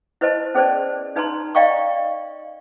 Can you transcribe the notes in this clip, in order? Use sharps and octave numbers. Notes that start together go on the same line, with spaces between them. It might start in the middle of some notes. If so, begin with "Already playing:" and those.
E4 B4 C5 D#5 A5
C#4 G#4 B4 C5 D5 A5
D4 D#4 B4 A5 A#5 C6
D5 D#5 F5 G5 A#5 C#6